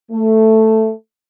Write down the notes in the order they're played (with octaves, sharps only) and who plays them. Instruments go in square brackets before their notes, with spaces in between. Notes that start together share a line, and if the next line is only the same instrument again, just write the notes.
[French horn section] A3